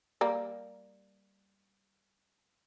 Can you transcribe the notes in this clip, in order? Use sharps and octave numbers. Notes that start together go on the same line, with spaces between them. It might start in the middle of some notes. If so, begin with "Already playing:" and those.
G3 A#3